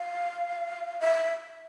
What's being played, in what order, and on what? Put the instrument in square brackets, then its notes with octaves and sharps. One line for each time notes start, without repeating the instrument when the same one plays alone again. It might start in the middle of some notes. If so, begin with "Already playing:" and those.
Already playing: [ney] F5
E5